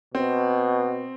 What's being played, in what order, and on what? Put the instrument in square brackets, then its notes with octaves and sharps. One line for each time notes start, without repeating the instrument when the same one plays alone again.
[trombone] B2 [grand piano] C4